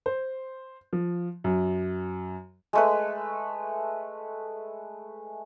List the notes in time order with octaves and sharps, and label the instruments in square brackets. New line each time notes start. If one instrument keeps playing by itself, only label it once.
[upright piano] C5
F3
F#2
[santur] G#3 A3 B4